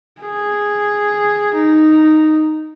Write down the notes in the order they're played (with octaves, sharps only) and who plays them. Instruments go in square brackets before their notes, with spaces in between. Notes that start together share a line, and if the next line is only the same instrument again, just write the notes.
[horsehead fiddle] G#4
D#4